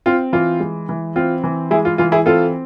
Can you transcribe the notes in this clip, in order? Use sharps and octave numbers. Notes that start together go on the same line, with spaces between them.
C4 F4
E3 F4
G#3
E3
C4 F4
E3
G#3 E4 G#4
F4
E3 F4
E4 G#4
C4 F4 A4